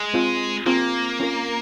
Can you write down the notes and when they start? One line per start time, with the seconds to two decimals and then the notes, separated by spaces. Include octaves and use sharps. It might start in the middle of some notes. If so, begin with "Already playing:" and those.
Already playing: G#3
0.14 C4 F4 G#4
0.66 A#3 C4 F4 G#4
1.20 C#4 F4 A#4